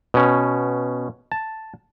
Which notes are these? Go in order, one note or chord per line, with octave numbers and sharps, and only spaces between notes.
B2 C#4
A5